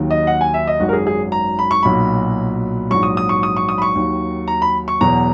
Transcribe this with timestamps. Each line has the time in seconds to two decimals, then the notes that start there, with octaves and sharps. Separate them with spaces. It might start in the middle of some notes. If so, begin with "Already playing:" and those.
Already playing: D#2 D#3 F#3
0.11 D#5
0.27 F#5
0.41 G#5
0.54 E5
0.67 D#5
0.80 G#1 F#2 D#3 F#3 F#4
0.89 A#4
0.93 G#4
1.07 G#4
1.32 A#5
1.59 B5
1.71 C#6
1.83 B1 A#2 F#3 B5
2.90 A#1 G#2 F#3 C#6
3.03 D#6
3.17 D#6
3.29 C#6
3.43 D#6
3.56 C#6
3.69 D#6
3.78 B5
3.82 C#6
3.95 D#2 D#3 F#3
4.48 A#5
4.62 B5
4.88 C#6
5.01 E2 B2 F#3 A#5